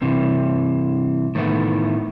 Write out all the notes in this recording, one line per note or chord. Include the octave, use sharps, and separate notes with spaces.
G2 C3 E3
A2 D#3 E3 A3 B3 E4